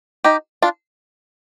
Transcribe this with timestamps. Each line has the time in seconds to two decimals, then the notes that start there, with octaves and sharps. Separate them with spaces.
0.24 D#4 G4
0.62 D4 F4